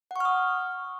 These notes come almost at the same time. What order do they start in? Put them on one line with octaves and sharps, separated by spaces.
F#5 C#6 F6 D#6